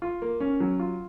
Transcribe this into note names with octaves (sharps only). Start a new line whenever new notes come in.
F4
A#3
C#4
F#3
F4